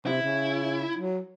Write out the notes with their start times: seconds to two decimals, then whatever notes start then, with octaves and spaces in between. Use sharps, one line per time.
0.07 C3 E4
0.22 C#3
0.97 F#3